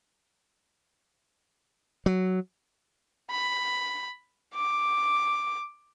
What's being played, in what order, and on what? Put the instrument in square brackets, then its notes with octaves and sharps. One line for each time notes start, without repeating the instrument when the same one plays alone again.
[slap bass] F#3
[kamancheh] B5
D6